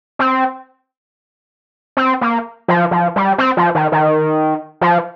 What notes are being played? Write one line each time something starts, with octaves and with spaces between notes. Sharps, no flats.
C4
C4
A#3
F3
F3
G3
C4
F3
D#3
D#3
F3